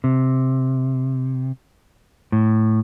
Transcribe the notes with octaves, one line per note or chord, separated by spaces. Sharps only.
C3
A2